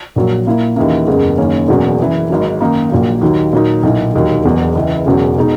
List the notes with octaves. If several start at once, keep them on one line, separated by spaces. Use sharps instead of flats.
A#1 A#2 F#3
A#2 A#3 E4
D#2 C#3 E3 A#3
F#1 E2 C#3 G#3
F#1 F#2 D#3 A#3 C#4
E1 E2 C#3 F#3
F#2 C#3 E3
G#1 G#2 F#3
F#2 D#3 A#3 D#4
A#1 A#2 F#3 A#3
D#2 D#3 F#3
A#2 F#3 A#3 D#4
B1 A#2 A#3 E4
E1 D#2 D#3 F#3
E1 E2 B2 F#3
C#2 C#3 E3
E1 E2 C#3 F#3
B2 G#3 D#4